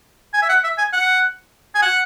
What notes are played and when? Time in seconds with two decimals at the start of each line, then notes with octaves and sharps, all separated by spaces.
0.34 G#5
0.43 E5
0.49 F#5
0.64 E5
0.78 G#5
0.93 F#5
1.75 G#5
1.82 F#5